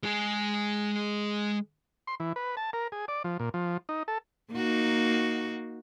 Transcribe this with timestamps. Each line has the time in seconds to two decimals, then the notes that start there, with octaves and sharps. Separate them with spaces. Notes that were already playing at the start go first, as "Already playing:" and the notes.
0.03 G#3 G#4
2.07 C6
2.20 E3
2.36 B4
2.57 A5
2.73 A#4
2.92 G#4
3.08 D5
3.24 F3
3.40 A#2
3.54 F3
3.89 D#4
4.08 A4
4.52 A#3 D#4 F#4